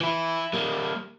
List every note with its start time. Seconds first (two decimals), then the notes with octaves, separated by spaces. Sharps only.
0.01 E3 E4
0.53 G3 A#3